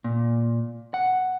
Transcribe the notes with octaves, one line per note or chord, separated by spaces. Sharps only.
A#2
F#5